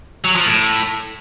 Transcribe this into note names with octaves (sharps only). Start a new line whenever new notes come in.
F#3
F3
A2